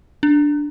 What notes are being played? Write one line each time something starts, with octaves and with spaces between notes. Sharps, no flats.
D4